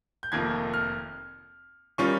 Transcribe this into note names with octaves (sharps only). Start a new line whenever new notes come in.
G6
F1 F2 D#3 A#3 F4 G#6
F6
D#3 G3 C#4 F4 C#6